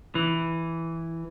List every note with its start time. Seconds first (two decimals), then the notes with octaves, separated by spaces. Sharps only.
0.15 E3